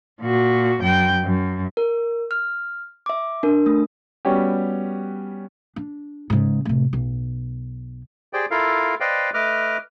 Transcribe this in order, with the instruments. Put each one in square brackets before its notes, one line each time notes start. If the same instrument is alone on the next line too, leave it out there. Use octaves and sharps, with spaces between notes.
[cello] A#2 F#4
F#2 G5
F#2
[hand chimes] A#4
F6
E5 D6
D4 A#4
A3 D#6
[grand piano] G3 B3 C#4 F#4 G4
[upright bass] D4
G#2 C#3
A2 C3
B1
[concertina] G4 G#4 C5 D5 G5
E4 F4 A4 A#4 F5
B4 C5 D5 D#5 F5 G5
A3 B4 D#5 D6 F6